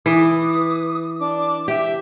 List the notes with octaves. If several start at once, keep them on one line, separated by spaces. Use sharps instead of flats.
E3 B4 D6 D#6
D4 D6
G4 E5